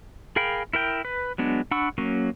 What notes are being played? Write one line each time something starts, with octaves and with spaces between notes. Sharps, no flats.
G#4 A#4 F5 G5 B5
E4 A#4 G5
B4
F#3 G#3 B3 D4
D4 F#5 B5 C#6 E6
F#3 A#3 C#4